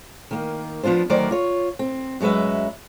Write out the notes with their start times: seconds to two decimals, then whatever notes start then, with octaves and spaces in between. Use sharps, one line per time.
0.31 D#3 A#3
0.83 F3 B3 D4 F4 C5
1.09 D2 D#3 F#3 A#4 C5 D5
1.31 F4 C#5
1.79 C4
2.20 F#2 F#3 G#3 B4 E5